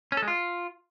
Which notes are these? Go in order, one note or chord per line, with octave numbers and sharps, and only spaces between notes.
C#4
A4
G#3
F4